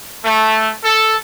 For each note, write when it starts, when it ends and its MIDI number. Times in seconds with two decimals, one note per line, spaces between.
0.25 0.72 57
0.84 1.18 69